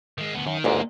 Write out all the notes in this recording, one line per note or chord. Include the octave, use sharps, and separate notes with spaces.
D#3 G#3
D2 B3
F#2 D#3
G1 D2 G#2 A#3 D#4